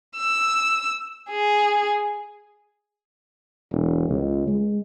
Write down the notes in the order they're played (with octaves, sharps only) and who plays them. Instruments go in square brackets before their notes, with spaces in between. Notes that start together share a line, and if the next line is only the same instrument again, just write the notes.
[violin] E6
G#4
[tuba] E1
C#2
G#3